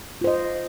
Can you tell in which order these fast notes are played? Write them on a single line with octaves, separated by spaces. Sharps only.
F4 C5 D#5